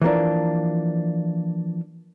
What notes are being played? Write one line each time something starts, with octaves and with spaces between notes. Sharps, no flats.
E3 F3 A#3 D4